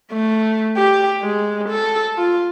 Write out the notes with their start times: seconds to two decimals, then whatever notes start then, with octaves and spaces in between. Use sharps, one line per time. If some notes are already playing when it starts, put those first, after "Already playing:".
0.12 A3
0.77 G4
1.22 G#3
1.69 A4
2.18 F4